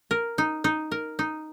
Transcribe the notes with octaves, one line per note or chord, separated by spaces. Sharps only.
A#4
D#4
D#4
A#4
D#4